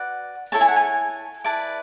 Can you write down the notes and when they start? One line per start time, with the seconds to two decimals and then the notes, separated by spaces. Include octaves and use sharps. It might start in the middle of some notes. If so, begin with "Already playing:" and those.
Already playing: F#4 B4 D5 F#5
0.52 E4 A4 C#5 A5
0.61 G#5
0.68 F#5
0.76 G#5
1.44 E4 B4 D5 A5